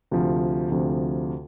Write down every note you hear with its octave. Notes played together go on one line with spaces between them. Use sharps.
D2 C3 F3
D2 C3 F3